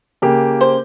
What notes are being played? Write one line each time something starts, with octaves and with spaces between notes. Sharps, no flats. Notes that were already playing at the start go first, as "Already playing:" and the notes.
C#3 A#3 G4
C5